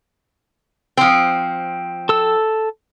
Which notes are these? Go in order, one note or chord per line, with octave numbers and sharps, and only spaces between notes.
F3 C4
A4 E6